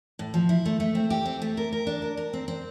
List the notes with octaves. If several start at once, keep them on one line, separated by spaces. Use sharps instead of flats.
A2
F3
E4
A3
A3
C4
G4
C4
A3
A#4
A#4
D4
A#4
A#4
C4
C4